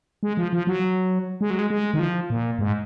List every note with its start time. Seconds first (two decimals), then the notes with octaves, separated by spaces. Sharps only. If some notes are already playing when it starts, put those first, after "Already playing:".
0.23 G#3
0.37 F3
0.53 F3
0.67 F#3
1.41 G#3
1.50 F#3
1.59 G#3
1.70 G#3
1.94 D#3
1.99 F3
2.30 A#2
2.59 G#2